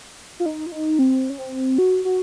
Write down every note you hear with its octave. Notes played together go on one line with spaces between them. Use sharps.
F4
D#4
F4
D#4
C4
C#4
C4
F#4
F#4